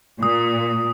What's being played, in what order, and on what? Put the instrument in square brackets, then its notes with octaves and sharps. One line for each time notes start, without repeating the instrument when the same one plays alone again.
[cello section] A#2 [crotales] D#6